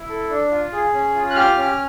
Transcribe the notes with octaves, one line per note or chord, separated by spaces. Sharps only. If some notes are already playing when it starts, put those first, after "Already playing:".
Already playing: E4
A4
D4
F4
G#4
C#4
F4
F#6
G4 F6
C#4